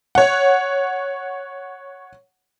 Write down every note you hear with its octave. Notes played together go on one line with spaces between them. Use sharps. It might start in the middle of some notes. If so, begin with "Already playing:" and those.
C#5 F#5